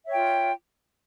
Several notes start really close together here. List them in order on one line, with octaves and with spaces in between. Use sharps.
E5 C#5 G5 F4